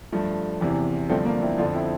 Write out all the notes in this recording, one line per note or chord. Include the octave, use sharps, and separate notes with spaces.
G2 F3 A3
E2 C3 E3
G2 D3 F3 A3 C4
A#3 D4
C4 E4
F2 D3 F3 D4 F4
C4 E4